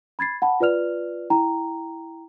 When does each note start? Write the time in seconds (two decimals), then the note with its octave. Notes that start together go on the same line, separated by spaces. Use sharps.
0.19 B5 G#6 A6 C7
0.42 F#5 G5 A5 B5
0.60 F4 B4 D5 F6 F7
1.30 E4 G5 A#5